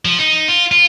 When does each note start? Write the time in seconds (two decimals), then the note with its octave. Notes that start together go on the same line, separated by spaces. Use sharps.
0.05 F3
0.19 D#4
0.48 F4
0.71 F4